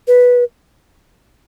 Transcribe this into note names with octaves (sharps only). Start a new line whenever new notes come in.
B4